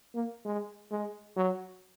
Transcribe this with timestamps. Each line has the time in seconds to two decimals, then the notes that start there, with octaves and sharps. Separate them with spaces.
0.15 A#3
0.45 G#3
0.91 G#3
1.36 F#3